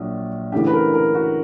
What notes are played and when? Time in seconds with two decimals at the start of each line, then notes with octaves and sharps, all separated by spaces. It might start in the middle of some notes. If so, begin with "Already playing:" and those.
Already playing: A#1 A#2 F#3
0.52 D2 C#3 E3 G4
0.67 B4
0.73 A#4
0.94 A#4
1.15 F#4